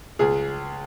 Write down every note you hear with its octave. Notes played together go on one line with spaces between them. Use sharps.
C#2 G#4